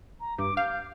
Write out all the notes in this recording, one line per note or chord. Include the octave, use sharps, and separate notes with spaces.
A#5
G2 D6
F5 G6